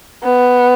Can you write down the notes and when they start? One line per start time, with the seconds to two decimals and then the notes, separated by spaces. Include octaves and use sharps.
0.23 B3